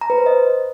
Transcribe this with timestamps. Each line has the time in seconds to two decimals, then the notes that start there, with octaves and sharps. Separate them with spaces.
0.01 A#5
0.10 B4
0.18 C5
0.26 D#5